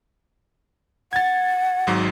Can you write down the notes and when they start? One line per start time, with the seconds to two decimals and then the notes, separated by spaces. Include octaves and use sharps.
1.13 F#5 G#6 A6
1.87 G#1 G#2 F#3